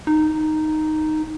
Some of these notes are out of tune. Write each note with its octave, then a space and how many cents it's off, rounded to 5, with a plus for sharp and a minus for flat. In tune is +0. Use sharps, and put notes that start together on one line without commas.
D#4 -5